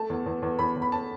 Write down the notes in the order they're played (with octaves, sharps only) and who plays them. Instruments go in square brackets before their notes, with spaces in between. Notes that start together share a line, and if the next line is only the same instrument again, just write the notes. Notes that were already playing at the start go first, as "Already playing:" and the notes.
Already playing: [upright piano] A3 A5
E2
E2
E2
E2 B5
E2
B5
A5